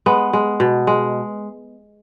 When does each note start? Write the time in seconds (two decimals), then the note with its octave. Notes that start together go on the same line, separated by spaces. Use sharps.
0.06 G#3 B3
0.33 G#3
0.60 B2
0.87 G#3